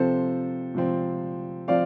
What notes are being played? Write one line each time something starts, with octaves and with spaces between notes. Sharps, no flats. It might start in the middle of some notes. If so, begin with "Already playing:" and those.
Already playing: C3 F3 C4 A4 C5
C3 F3 C4
F3 C4 D5 F5